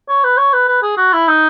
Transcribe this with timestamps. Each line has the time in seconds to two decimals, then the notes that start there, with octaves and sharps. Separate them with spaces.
0.09 C#5
0.24 B4
0.37 C#5
0.53 B4
0.68 B4
0.83 G#4
0.97 F#4
1.13 E4
1.28 D#4